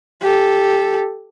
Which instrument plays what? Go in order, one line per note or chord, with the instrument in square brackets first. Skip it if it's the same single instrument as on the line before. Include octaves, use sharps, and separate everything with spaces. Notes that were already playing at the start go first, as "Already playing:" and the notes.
[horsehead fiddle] G4 A4